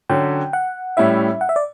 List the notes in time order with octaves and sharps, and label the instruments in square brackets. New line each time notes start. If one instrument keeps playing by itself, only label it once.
[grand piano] D3 F#3 C#4 F#4 [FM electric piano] G5
[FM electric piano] F#5
[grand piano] A2 G3 C#4 E4 [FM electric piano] E5
[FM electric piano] F#5
E5
D5